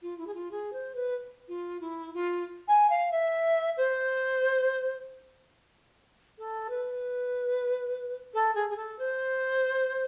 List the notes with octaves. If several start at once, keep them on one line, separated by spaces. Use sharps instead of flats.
F4
E4
G#4
F4
G#4
C5
B4
F4
E4
F4
G#5
F5
E5
C5
A4
B4
A4
G#4
G#4
A4
C5